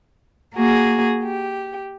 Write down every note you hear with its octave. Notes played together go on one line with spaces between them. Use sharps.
A#3 F#4 G#4
G4